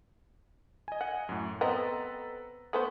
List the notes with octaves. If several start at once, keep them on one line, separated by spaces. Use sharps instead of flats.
D#5 G#5
F#5
F#2 A2
B3 C4 A4 B4 D#5 A#5
A3 B3 C5 D#6